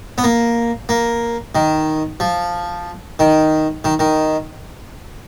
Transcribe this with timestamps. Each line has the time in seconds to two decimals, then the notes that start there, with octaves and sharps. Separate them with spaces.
0.18 B3
0.24 A#3
0.89 A#3
1.55 D#3
2.20 F3
3.19 D#3
3.85 D#3
3.99 D#3